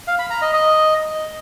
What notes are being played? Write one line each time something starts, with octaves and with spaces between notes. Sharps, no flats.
F5
B5
A#5
D#5
D#5